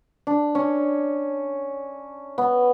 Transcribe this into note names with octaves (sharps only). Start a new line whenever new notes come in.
D4
C#4
B3